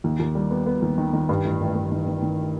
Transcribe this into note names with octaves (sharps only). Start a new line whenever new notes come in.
D#2
D#2
G3
B3
B3
D#2
D#3
D#3
G2
A1
A1
G2
D#3
D#3
D#3